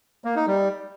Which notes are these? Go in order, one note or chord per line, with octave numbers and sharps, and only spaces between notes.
A#3
D#4
G3